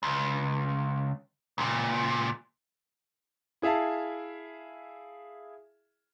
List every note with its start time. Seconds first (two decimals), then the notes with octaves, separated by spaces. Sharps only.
0.03 C#2
1.58 C#2 A#2
3.62 E4 G#4 E5 F5 A5